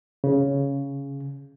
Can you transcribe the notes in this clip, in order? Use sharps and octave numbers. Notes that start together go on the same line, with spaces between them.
C#3